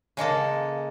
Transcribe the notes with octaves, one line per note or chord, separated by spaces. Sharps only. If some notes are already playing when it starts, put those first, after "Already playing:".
C#3 G#3 A#3 A4